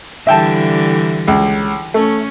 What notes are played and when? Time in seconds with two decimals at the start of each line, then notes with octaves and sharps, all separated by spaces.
0.27 D3 E3 G3 E5 G5 A5
1.28 C#2
1.94 A3 C#4